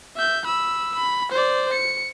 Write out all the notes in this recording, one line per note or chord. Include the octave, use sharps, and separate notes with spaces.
E5 G6
B5 E6
B5
C5 D5
C#7